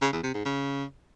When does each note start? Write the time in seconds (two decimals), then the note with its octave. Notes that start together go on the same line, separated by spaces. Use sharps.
0.02 C#3
0.13 E2
0.23 C3
0.34 G#2
0.45 C#3